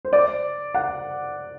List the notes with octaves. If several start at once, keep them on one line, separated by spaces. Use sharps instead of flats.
C5
D5
F#5